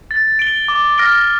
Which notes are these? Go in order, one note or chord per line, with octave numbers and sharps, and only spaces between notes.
A6
D7 G7
D6
F6 A#6 D7 G7